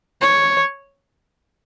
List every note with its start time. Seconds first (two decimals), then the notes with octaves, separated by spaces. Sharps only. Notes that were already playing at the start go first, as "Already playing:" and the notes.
0.22 C#5